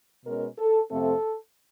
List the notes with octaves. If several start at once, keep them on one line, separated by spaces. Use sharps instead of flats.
B2 G#3 C#4 A#4
A4
F2 C3 F3 A3 C4 A4